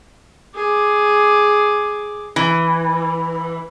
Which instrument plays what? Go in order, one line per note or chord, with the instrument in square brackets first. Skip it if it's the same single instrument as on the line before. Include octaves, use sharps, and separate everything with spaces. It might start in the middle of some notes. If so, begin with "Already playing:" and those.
[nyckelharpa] G#4 D6
[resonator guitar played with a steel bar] E3